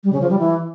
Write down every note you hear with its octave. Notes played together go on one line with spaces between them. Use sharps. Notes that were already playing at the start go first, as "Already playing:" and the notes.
G3
C#3
F3
G3
E3